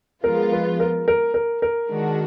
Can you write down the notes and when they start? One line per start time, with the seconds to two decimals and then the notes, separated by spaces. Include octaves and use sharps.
0.24 F3 G#3 B3 F4 A#4
0.52 B4
0.80 A#4
1.08 A#4
1.34 A#4
1.62 A#4
1.89 D#3 G#3 D4 F#4